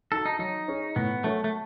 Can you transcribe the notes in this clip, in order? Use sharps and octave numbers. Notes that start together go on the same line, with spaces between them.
D#4 F#4 A4
D#4
F#3 D#4
C#4 G#4
A2 B3
F#3 A3 C#4 F#4 A4
A3